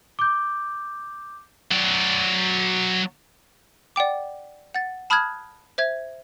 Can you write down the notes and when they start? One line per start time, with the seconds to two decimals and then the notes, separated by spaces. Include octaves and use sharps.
0.19 D6 G6
1.71 F#3 D5
3.96 D5 F#5 G5 D6
4.74 F#5 A6
5.10 A5 B5 D#6 F6 F#6 G#6
5.78 C5 E5 G#6